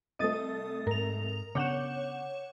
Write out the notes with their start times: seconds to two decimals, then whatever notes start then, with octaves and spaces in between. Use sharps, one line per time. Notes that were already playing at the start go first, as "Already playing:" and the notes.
0.19 C2 A3 A4 D#5 D#6 A6
0.87 G#2 A#4 F7
1.55 C#3 B3 D4 C#5 F#5 D6 G6 E7